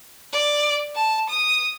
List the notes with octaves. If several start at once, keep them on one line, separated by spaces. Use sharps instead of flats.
D5
A5
D#6